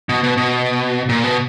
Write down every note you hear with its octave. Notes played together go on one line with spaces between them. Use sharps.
B2
B2
B2
A#2
B2